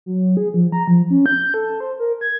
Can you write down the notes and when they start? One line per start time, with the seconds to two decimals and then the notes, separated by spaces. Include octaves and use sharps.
0.06 F#3
0.37 G#4
0.54 F3
0.72 A#5
0.87 F3
1.10 C#4
1.26 G6
1.54 A4
1.80 C5
1.99 A#4
2.21 G#6